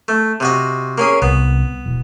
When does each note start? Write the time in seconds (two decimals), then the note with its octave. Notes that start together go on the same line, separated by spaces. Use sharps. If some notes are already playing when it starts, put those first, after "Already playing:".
0.08 A3
0.40 C3 F#4 D#5
0.98 A#3 C#4 G#4
1.22 C2 B3
1.86 E1